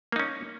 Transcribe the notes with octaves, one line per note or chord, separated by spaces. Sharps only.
A#3 C#4 D#4